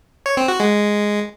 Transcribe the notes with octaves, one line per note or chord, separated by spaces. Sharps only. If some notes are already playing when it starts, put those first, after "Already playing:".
C#5
C4
F#4
G#3